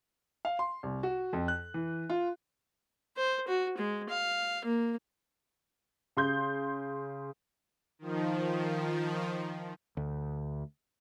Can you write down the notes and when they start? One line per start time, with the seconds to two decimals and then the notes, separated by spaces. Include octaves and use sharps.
0.45 F5
0.59 C6
0.83 C2
1.03 F#4
1.33 F2
1.48 F#6
1.74 E3
2.10 F4
3.16 C5
3.48 F#4
3.78 G#3
4.09 F5
4.65 A#3
6.17 C#3 C6 G6
7.99 D#3 F3
9.97 D2